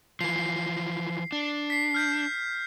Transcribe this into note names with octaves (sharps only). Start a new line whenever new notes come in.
E3 F3 C7
D4
B6 C7
F6 G6 B6